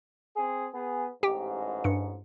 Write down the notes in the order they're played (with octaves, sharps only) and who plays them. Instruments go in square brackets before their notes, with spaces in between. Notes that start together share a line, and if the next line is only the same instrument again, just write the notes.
[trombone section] C4 G#4
B3 G#4
[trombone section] A1 G#2 [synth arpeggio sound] G4 G5
[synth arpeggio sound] G2 C#7